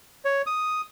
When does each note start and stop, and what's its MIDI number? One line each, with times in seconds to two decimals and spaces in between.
0.25 0.42 73
0.46 0.81 87